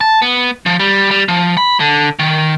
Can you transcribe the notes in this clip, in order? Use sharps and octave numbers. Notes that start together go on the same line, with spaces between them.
A5
B3
F3
G3
G3
F3
B5
D3
D#3